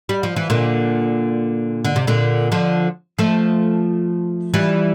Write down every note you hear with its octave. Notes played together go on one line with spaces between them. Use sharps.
G3
F3
E3
A#2 D3
D3
C3
A#2 D3
D3 F3
F3 A3
E3 G3